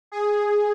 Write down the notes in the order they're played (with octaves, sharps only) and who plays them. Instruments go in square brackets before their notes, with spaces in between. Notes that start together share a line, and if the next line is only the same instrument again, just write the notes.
[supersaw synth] G#4